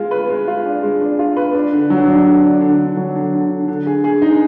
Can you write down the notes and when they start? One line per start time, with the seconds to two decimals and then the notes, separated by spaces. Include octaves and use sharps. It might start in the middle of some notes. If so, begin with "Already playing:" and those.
Already playing: G#3 F4
0.11 B4
0.30 G#3
0.47 F4
0.65 D4
0.83 G#3
1.01 D4
1.19 F4
1.37 B4
1.54 D4
1.73 D3
1.90 F#3
2.08 D4
2.26 D3
2.44 D4
2.61 D3
2.79 D3
2.97 F#3
3.15 D3
3.33 D3
3.51 D3
3.68 D3
3.86 G#4
4.04 G#4
4.22 D#4